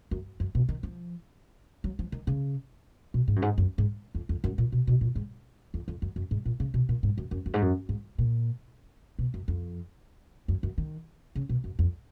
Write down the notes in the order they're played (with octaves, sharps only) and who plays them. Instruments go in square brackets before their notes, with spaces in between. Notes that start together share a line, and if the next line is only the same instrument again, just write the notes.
[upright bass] F#2
F#2
B2
D#3
F3
F#3
F3
D#3
C#3
B2
G#2
F#2
G#2
F#2
G#2
F2
F2
F#2
A#2
B2
B2
A#2
G#2
F2
F2
F#2
F#2
G#2
A#2
C#3
B2
A#2
G#2
F#2
F#2
F#2
G#2
F#2
G#2
A#2
B2
F#2
F2
F#2
F#2
D#3
C#3
B2
F#2
F2